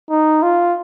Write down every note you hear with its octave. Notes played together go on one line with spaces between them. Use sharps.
D#4
F4